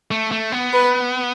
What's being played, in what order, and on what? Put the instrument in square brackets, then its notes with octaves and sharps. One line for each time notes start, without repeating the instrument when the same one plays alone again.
[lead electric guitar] A3
A3
B3
[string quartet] B4